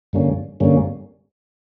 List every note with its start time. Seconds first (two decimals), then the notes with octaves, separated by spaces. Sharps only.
0.13 G2 D3 G3 A#3 C#4
0.60 G2 D3 G3 A#3 C#4